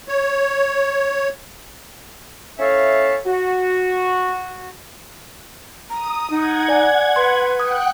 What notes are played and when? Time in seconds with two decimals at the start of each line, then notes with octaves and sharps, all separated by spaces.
0.08 C#5
2.59 C#4 E4 A4 C#5 E5 F5
3.26 F#4
5.90 A#5 D#6
6.30 D#4 F#5 G#6
6.68 D5 G#5
7.16 B4 C6
7.60 F#5 G5 D#6 F#6